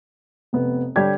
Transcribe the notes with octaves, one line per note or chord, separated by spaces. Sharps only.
F1 B3
D3 G3 D4 G4 C#5 G#6